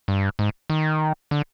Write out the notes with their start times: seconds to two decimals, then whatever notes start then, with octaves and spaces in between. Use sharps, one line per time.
0.08 G2
0.39 G#2
0.70 D#3
1.31 D3